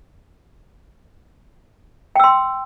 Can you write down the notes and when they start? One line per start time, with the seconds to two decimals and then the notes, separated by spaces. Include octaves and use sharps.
2.16 G5
2.20 E6
2.24 C6